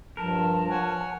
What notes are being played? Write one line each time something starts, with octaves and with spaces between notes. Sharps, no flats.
G2 F3 A#4 A5
C#5 F#5 G#5